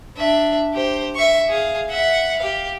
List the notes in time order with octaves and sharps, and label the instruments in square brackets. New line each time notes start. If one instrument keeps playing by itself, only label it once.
[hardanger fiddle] D4 E5
G4 C5
E5 C#6
G#4 F5
E5 F#5
G4 F5